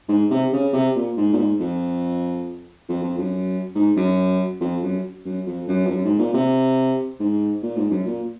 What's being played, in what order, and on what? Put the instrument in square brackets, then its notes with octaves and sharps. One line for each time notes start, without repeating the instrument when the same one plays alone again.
[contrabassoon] G#2
C3
C#3
C3
A#2
G#2
A#2
G#2
F2
F2
F2
F#2
G#2
F#2
F2
F#2
F#2
F2
F#2
F2
F#2
G#2
A#2
C3
G#2
A#2
G#2
F#2
A#2